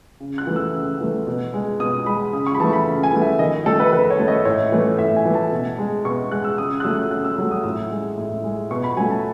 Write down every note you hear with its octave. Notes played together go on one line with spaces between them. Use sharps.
C#3
F#6
E3 A3
E6
C#3
E3 A3
B2
G#3
B2 D#6
G#3 B5
C#3 D#6
C#6
B5
E3 A3 A5
B5
C#3
G#5
E3 A3
E5
D#3 D#5
A3 A4
B4
D#3 B4
C#5
A3
D#5
A2 C#5
E3 A3
A2 E5
G#5
E3 A3
A5
B2
G#3
B2 C#6
G#3 F#6
E6
C#3 D#6
F#6
F#3 A3 E6
C#3 F#6
E6
F#3 A3
D#6
A2 E6
G#3
A2
G#3
B2 C#6
B5
F#3 A3 G#5
A5